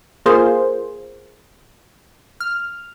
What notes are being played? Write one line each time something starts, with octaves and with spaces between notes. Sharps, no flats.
A#3 F4 G#4 C5
F6